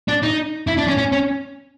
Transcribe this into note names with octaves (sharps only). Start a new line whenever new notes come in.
D4
D#4
E4
D4
C#4
C#4
C#4